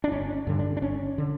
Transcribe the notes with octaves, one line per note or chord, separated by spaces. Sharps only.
D4
G1 C#4
G2 D3
D4
D4
G1 C#4
D3